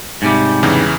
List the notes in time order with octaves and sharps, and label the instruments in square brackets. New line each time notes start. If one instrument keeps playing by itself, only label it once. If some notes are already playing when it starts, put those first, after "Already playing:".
[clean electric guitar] G#2 C3 G3
[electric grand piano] E2 C#3 E3